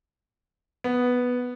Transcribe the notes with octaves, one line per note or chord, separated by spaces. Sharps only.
B3